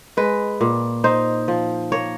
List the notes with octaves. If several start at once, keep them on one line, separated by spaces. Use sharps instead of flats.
G#3 B4
A#2
D#4 C5
F3
A#3 C#5